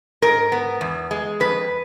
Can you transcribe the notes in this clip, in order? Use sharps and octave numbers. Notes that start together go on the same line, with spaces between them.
G#2 A#4
B3
E2
G#3
F2 B4